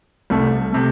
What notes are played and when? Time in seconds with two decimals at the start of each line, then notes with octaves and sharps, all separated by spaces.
0.30 C2 C3 A3
0.72 C3 A3